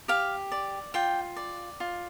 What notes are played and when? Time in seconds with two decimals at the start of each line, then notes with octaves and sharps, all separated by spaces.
0.08 G4 F5
0.52 D5
0.94 F4 G5
1.36 D5
1.80 F4